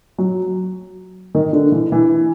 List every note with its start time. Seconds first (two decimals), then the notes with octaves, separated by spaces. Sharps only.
0.18 F#3
1.35 D#3
1.53 D3
1.72 E3
1.92 E3